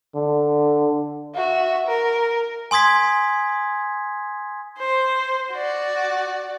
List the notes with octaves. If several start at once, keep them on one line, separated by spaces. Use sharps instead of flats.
D3
F#4 E5
A#4
G#5 C6 D#6 G#6 B6
C5
F#4 D5